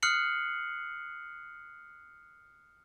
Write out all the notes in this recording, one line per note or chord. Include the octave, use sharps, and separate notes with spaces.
D#6 F6 F#6 C7 C#7 F#7